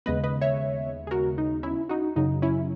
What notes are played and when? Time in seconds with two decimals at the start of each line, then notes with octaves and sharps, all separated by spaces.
0.06 D#2 C#3 G#3 B3 B4 D#5
0.24 B4 D#5
0.41 C#5 E5
1.07 G#4
1.11 F#4 A#4
1.38 D#4
1.63 C#4 E4
1.89 D#4 F#4
2.16 F#2 C#3 F#3 D#4
2.42 C#4 E4